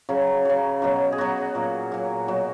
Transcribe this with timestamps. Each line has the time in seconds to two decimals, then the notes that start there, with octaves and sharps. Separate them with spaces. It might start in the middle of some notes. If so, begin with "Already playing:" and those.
0.09 C#3 F#3
0.45 C#3 F#3
0.82 B2 F#3
1.12 G#4
1.18 B2 F#3 F#4
1.55 A#2 F#3
1.92 A#2 F#3
2.28 B2 F#3